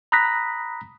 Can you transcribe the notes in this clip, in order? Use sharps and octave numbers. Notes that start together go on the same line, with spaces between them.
A#5 B5 D#6 F#6 A#6 B6